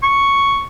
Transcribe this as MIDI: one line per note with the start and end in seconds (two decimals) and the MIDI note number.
0.03 0.66 85